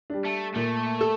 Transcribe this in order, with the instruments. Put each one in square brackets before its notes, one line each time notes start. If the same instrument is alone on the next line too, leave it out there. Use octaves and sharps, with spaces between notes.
[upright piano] G3 D4
[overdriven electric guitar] A3
[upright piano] A#2 [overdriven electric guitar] A3
[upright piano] A4